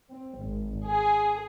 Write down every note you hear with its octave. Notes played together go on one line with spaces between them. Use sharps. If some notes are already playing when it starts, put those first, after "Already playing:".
C4
G#1
G#4